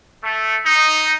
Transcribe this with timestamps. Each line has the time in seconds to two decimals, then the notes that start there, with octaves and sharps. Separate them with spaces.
0.24 A3
0.66 D#4